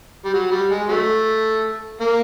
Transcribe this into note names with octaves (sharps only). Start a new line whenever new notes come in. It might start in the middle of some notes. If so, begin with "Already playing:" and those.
G3
F#3
G3
G#3
F#3 A3
A#3